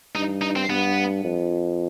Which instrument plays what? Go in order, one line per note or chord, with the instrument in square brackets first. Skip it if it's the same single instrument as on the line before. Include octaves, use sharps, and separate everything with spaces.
[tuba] G2 [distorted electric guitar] D#4
[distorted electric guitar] D#4
C4
[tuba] G2 [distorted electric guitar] B3
[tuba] F2